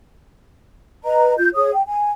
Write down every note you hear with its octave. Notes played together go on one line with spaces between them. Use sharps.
B4 D#5 A#5
F4 G6
G#4 C#5 D#6
G5
G#5